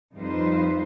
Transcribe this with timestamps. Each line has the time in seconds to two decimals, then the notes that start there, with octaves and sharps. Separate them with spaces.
0.13 F2 G3 D#4 F4 B4 C5